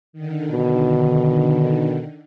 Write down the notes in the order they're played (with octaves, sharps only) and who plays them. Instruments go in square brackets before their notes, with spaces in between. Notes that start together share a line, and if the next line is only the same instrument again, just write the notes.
[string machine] D3 D#3
[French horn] B2